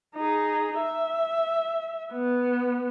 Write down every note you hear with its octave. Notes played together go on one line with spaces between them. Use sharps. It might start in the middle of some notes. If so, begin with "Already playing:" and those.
D#4 G#4
E5
B3